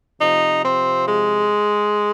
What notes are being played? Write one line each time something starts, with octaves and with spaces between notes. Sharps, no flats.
C3 F3 D#4
C4
G#3